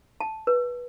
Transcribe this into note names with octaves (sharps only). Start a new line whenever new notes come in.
A5
B4